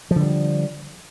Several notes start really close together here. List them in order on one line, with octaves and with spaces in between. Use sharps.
F3 D3 G3